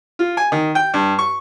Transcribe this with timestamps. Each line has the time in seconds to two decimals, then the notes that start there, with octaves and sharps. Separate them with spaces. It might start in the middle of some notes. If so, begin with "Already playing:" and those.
0.19 F4
0.37 G#5
0.52 D#3
0.75 G5
0.94 G2
1.19 C#6